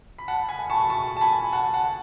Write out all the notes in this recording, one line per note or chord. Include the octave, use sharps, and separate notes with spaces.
B5
F#5 A5
G#5 B5
A5 C#6
A5 C#6
A5
G#5 B5
F#5 A5
F#5 A5